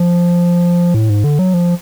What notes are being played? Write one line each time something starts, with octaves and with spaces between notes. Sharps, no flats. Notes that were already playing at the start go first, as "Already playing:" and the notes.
Already playing: F3
A2
G#2
D3
F#3
F3